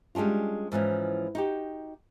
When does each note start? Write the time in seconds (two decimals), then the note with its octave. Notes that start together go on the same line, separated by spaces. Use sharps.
0.15 G3 G#3 C#4 D4 F4
0.72 G#2 E3 F3 C#4
1.35 D#4 F#4 G4